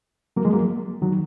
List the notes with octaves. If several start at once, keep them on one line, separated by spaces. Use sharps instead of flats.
F#3 A#3
F3 G#3
F#3 A#3
D#3 F#3